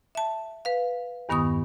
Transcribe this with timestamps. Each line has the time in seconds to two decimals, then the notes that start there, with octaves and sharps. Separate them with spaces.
0.15 E5 A5
0.65 B4 F5
1.29 E2 G2 D#3 B3 C#6 D#6